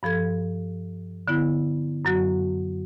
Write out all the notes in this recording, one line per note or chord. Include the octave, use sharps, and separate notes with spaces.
G2 F3 A4 G#6
D3 B3 E4
F#2 F#3 F#4